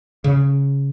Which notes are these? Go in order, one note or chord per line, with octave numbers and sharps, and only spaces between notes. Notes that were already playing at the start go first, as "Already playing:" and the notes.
C#3